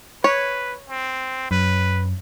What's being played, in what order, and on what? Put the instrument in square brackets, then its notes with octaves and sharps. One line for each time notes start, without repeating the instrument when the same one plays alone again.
[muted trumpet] B4 [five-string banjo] C#5
[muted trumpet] C4
[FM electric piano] F#2 [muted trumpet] B4